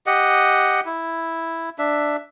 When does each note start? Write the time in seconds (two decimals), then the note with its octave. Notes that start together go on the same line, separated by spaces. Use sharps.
0.06 G4 D#5 F#5
0.86 E4
1.79 D4 E5